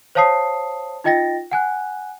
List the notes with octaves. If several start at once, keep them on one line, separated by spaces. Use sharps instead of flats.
C5 C#5 F5 A5 D#6 C7
D#4 F4 D#5 G5 A6 A#6
F#5 G#5 F#6